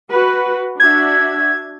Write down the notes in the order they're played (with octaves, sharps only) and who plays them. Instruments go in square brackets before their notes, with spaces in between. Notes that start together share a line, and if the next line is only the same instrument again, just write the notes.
[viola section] F#4 B4
[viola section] D4 F#4 E5 [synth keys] G#6